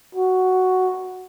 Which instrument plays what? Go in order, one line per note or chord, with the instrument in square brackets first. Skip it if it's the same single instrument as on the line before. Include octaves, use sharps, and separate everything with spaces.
[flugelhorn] F#4